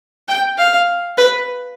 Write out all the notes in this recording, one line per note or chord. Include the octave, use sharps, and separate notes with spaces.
G5
F5
B4